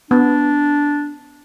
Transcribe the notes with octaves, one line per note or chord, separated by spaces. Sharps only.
B3 D4